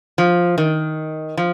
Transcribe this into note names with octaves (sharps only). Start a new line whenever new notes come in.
F3
D#3
F3